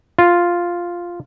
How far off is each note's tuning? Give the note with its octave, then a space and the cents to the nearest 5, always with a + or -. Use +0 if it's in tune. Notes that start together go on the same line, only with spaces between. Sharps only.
F4 +0